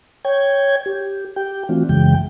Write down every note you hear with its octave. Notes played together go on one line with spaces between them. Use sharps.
C#5 G5 G#6
G4
G4 G5
E3 A3 C4 D4 F4 F#4
F#2 C#3 E3 G#3 G5